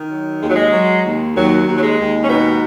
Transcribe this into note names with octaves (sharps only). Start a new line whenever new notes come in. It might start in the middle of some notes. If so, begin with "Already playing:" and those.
Already playing: D#3
F#3
D#2 G#3
F#3
G#3
F#3
D#2
D#2 F#3
D#2
F#3
G#3
D#2
C#4
G#2 B2 B3